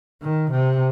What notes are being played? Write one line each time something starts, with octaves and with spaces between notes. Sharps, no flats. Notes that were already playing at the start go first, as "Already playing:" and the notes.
D#3
C3